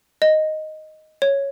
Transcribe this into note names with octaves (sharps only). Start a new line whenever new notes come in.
D#5
C#5